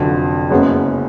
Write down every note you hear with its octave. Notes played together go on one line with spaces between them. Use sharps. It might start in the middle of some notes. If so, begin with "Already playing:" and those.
Already playing: F1 F2 D3 F#3
F#1 F#2 C#3 G#3 B3